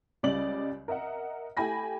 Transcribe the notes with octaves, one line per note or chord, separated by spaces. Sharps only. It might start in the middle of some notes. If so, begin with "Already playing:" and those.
C#2 C#3 G3 D5 D#5 F#7
A#4 D#5 E5 F#5
A3 E4 G4 G#5 B5 A#6